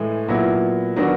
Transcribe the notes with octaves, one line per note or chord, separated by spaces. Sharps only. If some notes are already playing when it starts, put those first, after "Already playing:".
Already playing: A2 E3 G#3
A#2 F#3 B3 E4
D#3 F#3 B3 D4 F#4